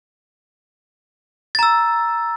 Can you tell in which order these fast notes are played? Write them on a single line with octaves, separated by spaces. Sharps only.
A6 A#5 E6